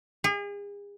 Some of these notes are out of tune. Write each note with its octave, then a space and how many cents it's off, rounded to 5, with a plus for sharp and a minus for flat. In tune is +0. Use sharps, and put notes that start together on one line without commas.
G#4 -40